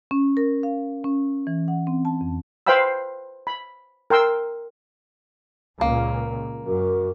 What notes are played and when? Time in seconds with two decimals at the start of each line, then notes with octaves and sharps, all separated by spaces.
0.11 C#4
0.37 A#4
0.63 F5
1.04 C#4
1.47 E3
1.68 F#5
1.87 C4
2.05 A5
2.21 F2
2.67 B4 C5 F5 G5 B5 E6
3.47 B5
4.10 A#4 G5 C6 E6
5.81 C#2 A#2 A#3
6.66 F#2 F#4 A#4 D6